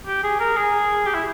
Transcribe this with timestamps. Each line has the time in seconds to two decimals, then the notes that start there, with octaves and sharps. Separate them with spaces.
0.07 G4
0.24 G#4
0.40 A#4
0.56 G#4
1.06 G4
1.14 E4